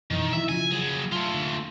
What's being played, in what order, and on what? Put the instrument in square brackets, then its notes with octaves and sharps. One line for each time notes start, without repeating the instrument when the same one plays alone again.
[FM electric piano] F#2 B2 E3 [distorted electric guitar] D#3
[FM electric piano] D#3 E3 E4 [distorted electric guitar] E5
[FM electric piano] C#3 F3 [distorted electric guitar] G#5
[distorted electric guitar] F#3 G#4
A3 F4
[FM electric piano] D3 C#6